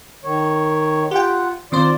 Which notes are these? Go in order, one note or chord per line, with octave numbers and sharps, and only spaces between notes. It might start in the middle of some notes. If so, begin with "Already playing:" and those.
D#3 C#5
F4 G4 F#5 G5
D#3 C4 F4 C5 D5